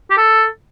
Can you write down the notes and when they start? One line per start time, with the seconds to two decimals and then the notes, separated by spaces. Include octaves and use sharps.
0.10 G4
0.17 A4